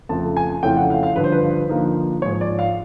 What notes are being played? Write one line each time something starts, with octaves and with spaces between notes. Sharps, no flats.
F2 C#3 F3 A3 A5
G#5
F2 C#3 E3 A3 C#4 G5
F#5
F5
F5
G2 D3 F3 B4
C5
B4
D3 F3 A#3 D#4
G#2 F3 G#3 C#5
D5
F5